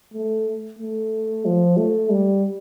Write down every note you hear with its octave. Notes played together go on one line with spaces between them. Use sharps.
A3
A3
F3
A3
G3